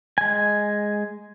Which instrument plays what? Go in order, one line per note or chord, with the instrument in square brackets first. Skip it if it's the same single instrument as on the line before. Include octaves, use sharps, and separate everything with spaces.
[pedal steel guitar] G#3 G#5